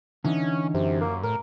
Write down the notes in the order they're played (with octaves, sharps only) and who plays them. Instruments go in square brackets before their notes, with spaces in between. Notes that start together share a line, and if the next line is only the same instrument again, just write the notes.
[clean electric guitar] D3 E3 D#4 [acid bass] C#4
[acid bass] F#2 [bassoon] C3
[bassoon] A#3
[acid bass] A2 [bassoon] A#4